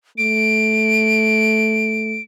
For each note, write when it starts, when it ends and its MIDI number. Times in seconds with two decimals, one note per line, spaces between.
0.18 2.19 57
0.18 2.22 98